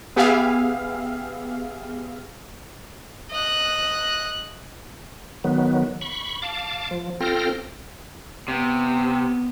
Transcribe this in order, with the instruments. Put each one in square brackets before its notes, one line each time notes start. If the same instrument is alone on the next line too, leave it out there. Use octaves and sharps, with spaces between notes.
[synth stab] B3 G4 G#4 E5 F5
[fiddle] D#5 F#6
[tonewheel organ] D#3 F#3 B3
B5 C#6
F5 A5 D6
F3
C4 F4 A4 G5 F6 A#6
[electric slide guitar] C3 [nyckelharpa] B3